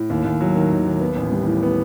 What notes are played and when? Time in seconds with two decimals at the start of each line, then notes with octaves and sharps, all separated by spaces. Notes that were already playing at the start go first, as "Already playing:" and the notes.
Already playing: A2
0.10 D#2
0.25 D#2
0.41 F#3
0.55 D#3
0.71 D#2
0.86 D#2
1.01 B3
1.16 A1
1.31 G3
1.47 A2
1.63 B3